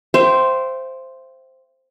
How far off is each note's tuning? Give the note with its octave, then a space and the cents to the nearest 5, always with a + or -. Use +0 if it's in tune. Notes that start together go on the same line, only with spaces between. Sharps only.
C5 +0 E5 +40 G5 -20